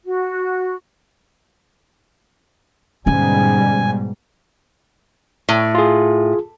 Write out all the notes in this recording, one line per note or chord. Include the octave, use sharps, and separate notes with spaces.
F#4
G#2 B2 D3 G3 C#4 G#5
A2
F4 G#4